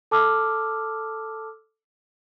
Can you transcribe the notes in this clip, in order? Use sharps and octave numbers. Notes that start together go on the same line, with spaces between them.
A4 A5 D6 E6 F6